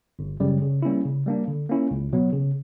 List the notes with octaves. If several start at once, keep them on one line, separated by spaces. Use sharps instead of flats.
G1
F#2 C#3 G3
C#3
G3 A#3 C#4 E4
C#3
G3 A#3 D4
D3
A#3 C#4 E4
C#2
B2 F#3 B3
C#3